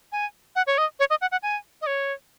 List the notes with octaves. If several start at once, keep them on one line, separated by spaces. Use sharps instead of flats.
G#5
F#5
C#5
D#5
C#5
D#5
F#5
F#5
G#5
D#5
C#5